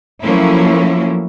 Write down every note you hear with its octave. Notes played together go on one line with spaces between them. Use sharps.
F3 F#3 A3 A#3 C#4 E4